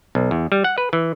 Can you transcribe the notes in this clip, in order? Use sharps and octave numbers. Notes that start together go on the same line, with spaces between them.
B1
E2
G3
F#5
B4
E3